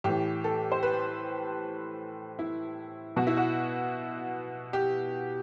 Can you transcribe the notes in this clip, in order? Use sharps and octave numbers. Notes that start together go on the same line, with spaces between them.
A2 E3 G4
A4
C5
B4
E4
B2 F#4
E4
F#4
G4